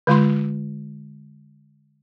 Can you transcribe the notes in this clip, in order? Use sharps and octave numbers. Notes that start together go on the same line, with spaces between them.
D3 G#3 F4 C6